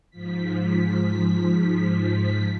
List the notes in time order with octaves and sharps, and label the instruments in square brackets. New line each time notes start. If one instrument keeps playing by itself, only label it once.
[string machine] G#2 F3 B6